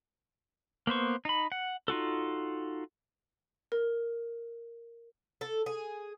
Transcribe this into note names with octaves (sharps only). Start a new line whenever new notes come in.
A#3 B3 C5 C#6
D#4 B5
F#5
D#4 F4 F#4 A4
A#4
A4
G#4